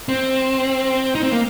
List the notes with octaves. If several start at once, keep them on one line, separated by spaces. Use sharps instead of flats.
C4
D#4
C4
A#3